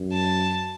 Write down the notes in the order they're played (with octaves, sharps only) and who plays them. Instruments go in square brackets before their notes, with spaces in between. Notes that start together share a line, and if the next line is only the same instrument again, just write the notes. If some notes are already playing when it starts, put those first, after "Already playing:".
Already playing: [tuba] F#2
[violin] A5